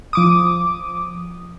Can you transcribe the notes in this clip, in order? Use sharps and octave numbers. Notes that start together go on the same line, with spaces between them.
F3 D6 D#6